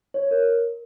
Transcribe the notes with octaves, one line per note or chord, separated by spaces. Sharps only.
C#5
A#4